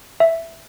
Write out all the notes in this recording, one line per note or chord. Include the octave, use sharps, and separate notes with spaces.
E5